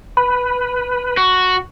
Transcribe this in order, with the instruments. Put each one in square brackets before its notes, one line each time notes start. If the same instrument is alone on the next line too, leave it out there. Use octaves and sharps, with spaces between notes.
[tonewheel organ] B4 [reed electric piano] B5
[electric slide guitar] F#4